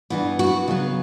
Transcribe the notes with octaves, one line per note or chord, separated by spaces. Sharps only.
G2 E3 B3
F#4
C#3 F#3 B3